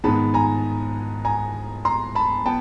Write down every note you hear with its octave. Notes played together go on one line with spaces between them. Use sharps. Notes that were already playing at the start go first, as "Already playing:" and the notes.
G#2 D#3 G#3 B3 A5 B5
G#5 A#5
G#5 A#5
A#5 C6
A5 B5
B3 G5 A5